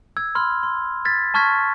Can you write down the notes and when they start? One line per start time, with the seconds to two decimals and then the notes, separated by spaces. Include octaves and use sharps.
0.17 E6 G#6
0.35 B5 C6 F6
0.63 C6
1.05 F6 G#6 A6 B6
1.34 A5 C#6 F6 G#6 B6